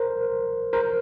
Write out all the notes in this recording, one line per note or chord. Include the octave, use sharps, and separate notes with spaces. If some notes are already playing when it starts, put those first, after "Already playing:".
Already playing: A#4 C5
A#4 C5